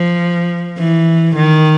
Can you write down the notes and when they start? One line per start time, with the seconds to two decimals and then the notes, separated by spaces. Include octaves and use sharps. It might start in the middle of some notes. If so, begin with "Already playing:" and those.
Already playing: F3
0.78 E3
1.36 D#3